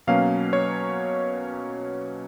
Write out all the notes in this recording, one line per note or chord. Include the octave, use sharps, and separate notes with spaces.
B2 F#3 A#3 C#4 F5
C#5